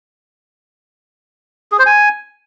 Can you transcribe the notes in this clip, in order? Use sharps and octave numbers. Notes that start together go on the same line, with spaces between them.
G#4
C5
G#5